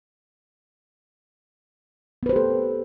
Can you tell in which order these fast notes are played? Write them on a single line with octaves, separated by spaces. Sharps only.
B3 B4 C5 G4 A4